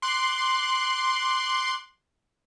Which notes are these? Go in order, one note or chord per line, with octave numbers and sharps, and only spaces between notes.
C6 D6 F#6